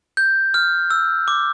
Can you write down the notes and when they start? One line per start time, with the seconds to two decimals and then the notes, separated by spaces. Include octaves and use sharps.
0.17 G6
0.54 F6
0.90 E6
1.28 D6